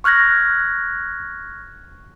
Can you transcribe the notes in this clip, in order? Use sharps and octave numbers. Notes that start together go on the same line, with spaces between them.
C#6 F6 F#6 G#6 A#6